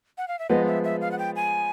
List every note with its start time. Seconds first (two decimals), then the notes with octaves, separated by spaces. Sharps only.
0.18 F#5
0.28 F5
0.39 E5
0.50 F3 G#3 B3 D#5
0.67 E5
0.84 E5
1.01 F5
1.12 F#5
1.19 G5
1.36 G#5